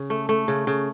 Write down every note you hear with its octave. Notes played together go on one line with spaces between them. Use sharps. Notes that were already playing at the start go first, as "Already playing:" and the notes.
Already playing: C#3
A3
A3
C#3
C#3